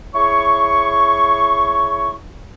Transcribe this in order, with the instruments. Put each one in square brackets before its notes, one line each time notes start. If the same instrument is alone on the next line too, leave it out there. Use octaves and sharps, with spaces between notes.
[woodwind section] E4 G#4 C#5 C#6